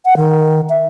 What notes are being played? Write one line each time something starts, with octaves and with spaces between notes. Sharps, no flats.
F#5
D#3
E5